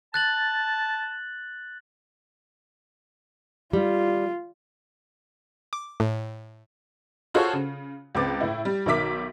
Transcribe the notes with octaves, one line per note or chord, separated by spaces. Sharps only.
A5 F#6 A6 F#7
G3 F4
D6
A2
F4 F#4 G#4 A4 C5 C#5
C#3
C#2 C4 B4 D6 A6
A2 E4
G3
B1 D#3 A#4 E5 D6 B6